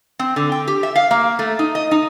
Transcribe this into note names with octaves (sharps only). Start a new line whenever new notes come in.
C4
D3
G5
G4
E5
F5
A#3
A3
D#4
D#5
D#4